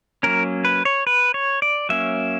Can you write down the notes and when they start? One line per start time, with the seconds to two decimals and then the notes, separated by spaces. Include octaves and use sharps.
0.23 F#3 A#3 C#4 A#4
0.65 B4
0.85 C#5
1.07 B4
1.34 C#5
1.62 D5
1.89 F#3 A#3 C#4 E5